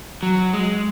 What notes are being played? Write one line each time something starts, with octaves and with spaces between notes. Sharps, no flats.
F#3
G#3